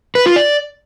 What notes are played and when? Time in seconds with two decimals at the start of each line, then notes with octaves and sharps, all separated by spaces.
0.15 B4
0.26 F4
0.36 D5